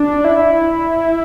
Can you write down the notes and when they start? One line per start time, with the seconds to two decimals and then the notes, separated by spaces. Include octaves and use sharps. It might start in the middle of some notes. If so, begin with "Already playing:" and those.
Already playing: D4
0.25 E4